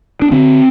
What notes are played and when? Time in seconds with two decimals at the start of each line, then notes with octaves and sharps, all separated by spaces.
0.22 D4
0.32 D3 C4